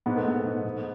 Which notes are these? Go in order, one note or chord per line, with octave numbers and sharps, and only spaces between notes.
G#2 B3
A3
G#2 B3
G#2
G#2